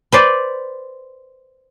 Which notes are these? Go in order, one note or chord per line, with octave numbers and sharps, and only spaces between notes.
B4 C5 D5